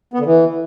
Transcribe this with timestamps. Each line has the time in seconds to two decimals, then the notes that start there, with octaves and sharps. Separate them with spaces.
0.13 B3
0.20 D3
0.26 E3